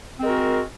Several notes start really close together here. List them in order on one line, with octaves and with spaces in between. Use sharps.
C4 G#3 A#4 F#4